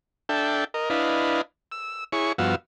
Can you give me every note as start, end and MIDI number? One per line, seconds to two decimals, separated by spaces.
0.29 0.64 62
0.29 0.64 69
0.29 0.64 76
0.29 0.64 79
0.74 0.89 70
0.74 0.89 75
0.90 1.41 62
0.90 1.41 64
0.90 1.41 71
0.90 1.41 75
0.90 1.41 77
1.72 2.04 88
2.12 2.32 64
2.12 2.32 68
2.12 2.32 73
2.12 2.32 85
2.38 2.55 43
2.38 2.55 53
2.38 2.55 59
2.38 2.55 66
2.38 2.55 77
2.38 2.55 88